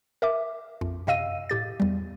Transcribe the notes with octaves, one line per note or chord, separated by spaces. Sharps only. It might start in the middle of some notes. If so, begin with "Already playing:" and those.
A#4 E5 D6
A#1 F2
F#2 C3 D#5 F5 E6 D#7
A2 G4 A6
E2 G3